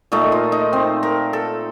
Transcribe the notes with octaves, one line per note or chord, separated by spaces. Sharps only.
A#2 A3 D#4
F4
D#4
C4
A#4
A4